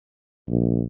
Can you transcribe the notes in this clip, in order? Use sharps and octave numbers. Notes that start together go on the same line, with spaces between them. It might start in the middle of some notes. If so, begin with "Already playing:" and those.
A#1